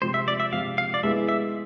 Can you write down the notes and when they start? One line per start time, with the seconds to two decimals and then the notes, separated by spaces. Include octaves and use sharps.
0.02 C3 F3 G#3 C5
0.14 E5
0.28 D5
0.40 E5
0.52 C3 F3 G#3 F5
0.78 F5
0.94 D5
1.03 G#3 B3 E4 G#4 E5
1.29 E5